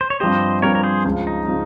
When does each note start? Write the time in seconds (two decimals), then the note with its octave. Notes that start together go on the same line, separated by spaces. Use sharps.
0.01 C5
0.10 C#5
0.20 G2 F3 C4 G4 C5 D#5
0.62 G2 F3 C4 G4 A#4 C#5
0.75 A#4
0.83 G#4 C5
1.05 C#2 C#3 F3
1.27 D#4
1.48 C#3 F3